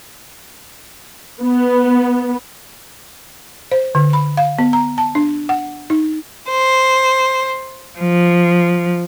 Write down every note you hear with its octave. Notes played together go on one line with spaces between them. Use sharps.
B3
C5
D3
B5
F5
B3
A#5
A5
D4
F#5
D#4
C5
F3